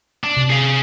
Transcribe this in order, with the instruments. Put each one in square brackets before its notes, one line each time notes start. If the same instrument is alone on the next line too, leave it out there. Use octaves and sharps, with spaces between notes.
[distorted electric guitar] D4
[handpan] C3
[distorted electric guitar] G#4 F5